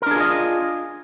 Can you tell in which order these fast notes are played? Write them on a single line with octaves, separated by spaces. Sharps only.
A#4 D4 G#4 F4 D#5